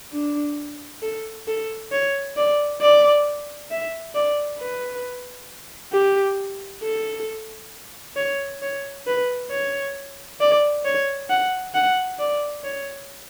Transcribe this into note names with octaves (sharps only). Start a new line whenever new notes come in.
D4
A4
A4
C#5
D5
D5
E5
D5
B4
G4
A4
C#5
C#5
B4
C#5
D5
C#5
F#5
F#5
D5
C#5